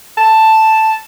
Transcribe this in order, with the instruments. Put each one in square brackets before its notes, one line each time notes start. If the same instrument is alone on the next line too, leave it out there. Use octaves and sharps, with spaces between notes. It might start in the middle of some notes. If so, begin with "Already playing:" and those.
[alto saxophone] A5